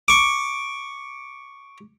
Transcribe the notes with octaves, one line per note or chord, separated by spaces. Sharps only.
C#6 D6